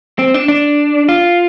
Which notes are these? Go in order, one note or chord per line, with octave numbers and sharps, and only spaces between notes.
C4
D4
D4
F4